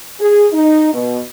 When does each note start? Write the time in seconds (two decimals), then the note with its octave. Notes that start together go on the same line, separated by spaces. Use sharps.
0.20 G#4
0.52 D#4
0.93 B2